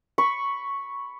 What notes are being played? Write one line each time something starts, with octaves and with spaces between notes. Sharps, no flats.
B5 C#6